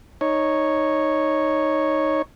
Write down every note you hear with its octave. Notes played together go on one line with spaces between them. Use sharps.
D#4 C#5